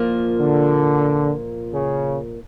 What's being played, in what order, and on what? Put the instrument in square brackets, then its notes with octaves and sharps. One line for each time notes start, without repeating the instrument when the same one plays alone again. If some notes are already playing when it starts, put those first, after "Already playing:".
Already playing: [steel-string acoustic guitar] A#2 F3 A#3
[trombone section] D3
C#3